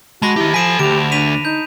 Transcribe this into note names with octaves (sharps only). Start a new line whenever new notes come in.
G#3 F#4 A5 B5 A#6
D#3 E4 G4
F3 A4 G#5 B6 D7 E7
D2 G4 D7 F7
D4 B6 D#7 F7
D#4 G6